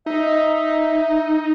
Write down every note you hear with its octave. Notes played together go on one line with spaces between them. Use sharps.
D#4 E5